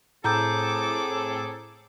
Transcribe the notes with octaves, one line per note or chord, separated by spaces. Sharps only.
A2 C4 G#4 A4 A#5 D6 G6